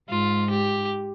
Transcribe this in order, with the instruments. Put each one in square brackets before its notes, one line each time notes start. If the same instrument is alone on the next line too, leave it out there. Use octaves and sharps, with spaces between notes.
[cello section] G#2 [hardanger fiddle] F4
[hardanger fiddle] G4